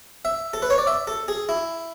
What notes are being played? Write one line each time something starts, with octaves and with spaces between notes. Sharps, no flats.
E5
A4
B4
C#5
D5
E5
A4
G#4
E4